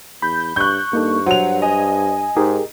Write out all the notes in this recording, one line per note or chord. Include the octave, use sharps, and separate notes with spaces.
E2 B5 G6
G2 C#6 F#6 G6
G2 A#3 D#4 A4
F#3 C5 F#5 F7
D#5 G#5
G#2 D#4 G4 G#4 A#4